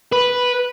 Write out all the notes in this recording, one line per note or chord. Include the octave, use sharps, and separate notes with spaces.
B4